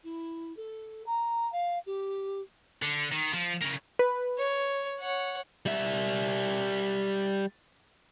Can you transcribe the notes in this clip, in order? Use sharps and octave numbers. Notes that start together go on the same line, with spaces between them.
E4
A4
A#5
F5
G4
D3
D#3
F3
C#3 A#3
B4
C#5
C#5 F#5
G3 E5